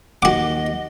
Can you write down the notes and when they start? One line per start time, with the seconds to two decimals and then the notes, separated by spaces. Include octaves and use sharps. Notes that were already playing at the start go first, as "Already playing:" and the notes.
0.22 D#2 F#4 D#5 F#5 D6